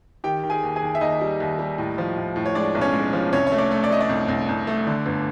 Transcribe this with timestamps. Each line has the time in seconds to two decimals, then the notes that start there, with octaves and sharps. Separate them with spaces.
0.24 D#3 G4 G5
0.43 D#3
0.50 G#4 G#5
0.63 D#2
0.76 G#4 G#5
0.82 D#2
0.95 E5
1.01 D#2 D#4 D#5
1.21 G3
1.40 D#2
1.59 G3
1.78 A2
1.98 F3
2.17 A2
2.36 A2
2.46 C#5
2.55 G#3 D4 D5
2.75 B1
2.81 C#4 C#5
2.94 G#3
3.13 F3
3.33 C2 C#4 C#5
3.47 A3 C#5
3.58 D4 D5
3.71 A3
3.84 D5
3.90 A3 D#5
4.00 D4 D5
4.09 C2
4.28 C2
4.49 C2
4.67 A3
4.87 D3
5.06 G1